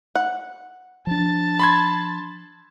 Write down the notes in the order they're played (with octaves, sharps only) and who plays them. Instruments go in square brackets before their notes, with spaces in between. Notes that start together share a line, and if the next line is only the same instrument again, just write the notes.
[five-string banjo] F#5
[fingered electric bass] F3 D4 [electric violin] A5 A6
[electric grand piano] B5 C6 G#6